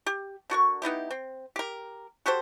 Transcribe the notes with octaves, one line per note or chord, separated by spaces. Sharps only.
G4
D3 F#4 A#4 C#6
B3 D#4 E4 G4
C4
G4 A#4
F#4 G4 A4 C5